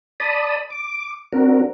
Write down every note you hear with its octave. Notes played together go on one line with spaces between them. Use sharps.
D5 A5 B5 D#6
D6
C4 D4 F#4 A#4